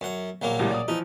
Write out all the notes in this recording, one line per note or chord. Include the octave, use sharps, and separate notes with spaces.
F#2 F#5
A#1 F#3 A#3
C#2 A2 G3
D5 D#6
E3 F3 D#4